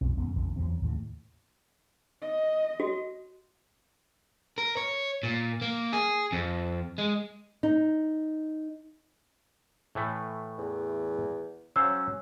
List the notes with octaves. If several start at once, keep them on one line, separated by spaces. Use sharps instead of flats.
B1 F2
D#1 F#2 B3
F1 A#1 F2 D3
E2 F3 F#3 C4
D#2 A2 C#3
D#5
F#4
A#4
C#5
A#2
A#3
G#4
F2
G#3
D#4
A2 E3 A3
E2
F#3 C#4 C5 F5 E6